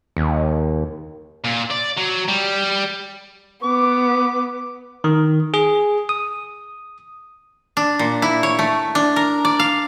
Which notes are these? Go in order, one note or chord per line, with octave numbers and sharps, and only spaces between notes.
D#2
A#2
D5
F#3
G3
B3 D6
D#3
G#4
D#6
D4
A#2
E4
C#5
A3
D4
A#4
D5
F5